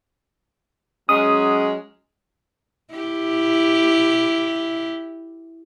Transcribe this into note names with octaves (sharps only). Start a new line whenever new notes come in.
F#3 G#3 C#4 D#6
E4 G4